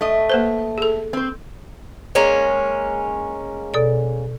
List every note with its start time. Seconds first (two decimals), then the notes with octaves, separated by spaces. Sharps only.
0.01 A3 D#5
0.30 A#3 B4 C5
0.78 G#4 A4
1.13 C4 C5
2.15 G#3 A#3 C#4
3.74 B2 A4 D5